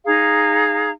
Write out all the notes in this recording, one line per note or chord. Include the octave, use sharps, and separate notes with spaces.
D#4 G#4 F5 A#5